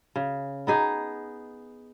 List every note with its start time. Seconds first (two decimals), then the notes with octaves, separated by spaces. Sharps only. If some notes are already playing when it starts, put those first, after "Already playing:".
0.16 C#3
0.67 B3 D#4 G#4